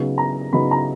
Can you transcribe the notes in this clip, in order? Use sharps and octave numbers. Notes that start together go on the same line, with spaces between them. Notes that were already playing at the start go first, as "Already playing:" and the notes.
Already playing: C#3 F#3 B3 D#4
A#5
C#3 F#3 B3 D#4 B5
A#5